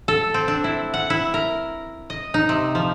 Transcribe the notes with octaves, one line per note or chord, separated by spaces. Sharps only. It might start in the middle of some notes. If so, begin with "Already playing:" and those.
A4
C4
D4
E4
F#5
E4
A#4
D#5
D#4
C3
F3